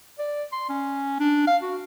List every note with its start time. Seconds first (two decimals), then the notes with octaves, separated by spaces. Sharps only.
0.19 D5
0.52 C6
0.69 C#4
1.20 D4
1.47 F5
1.62 F#4